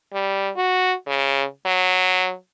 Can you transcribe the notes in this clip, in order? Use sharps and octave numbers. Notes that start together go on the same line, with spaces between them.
G3
F#4
C#3
F#3